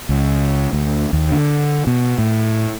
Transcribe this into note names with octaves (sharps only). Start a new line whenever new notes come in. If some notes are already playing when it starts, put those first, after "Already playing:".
C#2
D2
D#2
D3
B2
A2